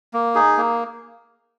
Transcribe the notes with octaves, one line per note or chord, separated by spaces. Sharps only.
A#3
D#4 G#4
A#3